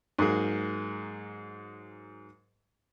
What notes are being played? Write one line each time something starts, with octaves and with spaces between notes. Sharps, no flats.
G#2 F#3 A#3 G#4